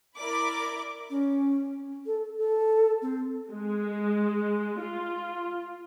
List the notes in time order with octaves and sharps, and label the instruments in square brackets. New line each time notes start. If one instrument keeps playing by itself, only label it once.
[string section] E4 A#4 D5 B5 D6
[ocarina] C#4
A4
A4
C4
[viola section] G#3
F4